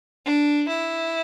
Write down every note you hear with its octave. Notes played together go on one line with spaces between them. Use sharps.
D4
E4